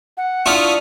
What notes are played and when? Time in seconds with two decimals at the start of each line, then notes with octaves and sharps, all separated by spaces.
0.17 F#5
0.46 D4 E4 F4 C#6 D#6 F6